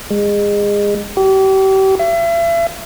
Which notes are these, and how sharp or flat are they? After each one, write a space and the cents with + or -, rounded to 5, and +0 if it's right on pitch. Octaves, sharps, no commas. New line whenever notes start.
G#3 -25
G4 -35
E5 +40